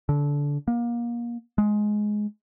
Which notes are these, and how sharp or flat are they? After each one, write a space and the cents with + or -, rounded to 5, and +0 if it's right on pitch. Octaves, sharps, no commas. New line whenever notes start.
D3 -20
A#3 +30
G#3 +10